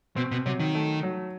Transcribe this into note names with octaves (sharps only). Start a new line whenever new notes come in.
B2 C4
B2
C3 F#3
D#3
A3
F#3